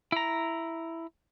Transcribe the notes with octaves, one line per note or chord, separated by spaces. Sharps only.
E4 A#5